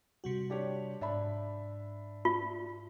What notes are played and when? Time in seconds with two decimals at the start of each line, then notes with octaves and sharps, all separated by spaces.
0.24 C3 G3 F#4
0.50 D4 G4 C#5
1.01 G#2 D4 E5 B5
2.25 F4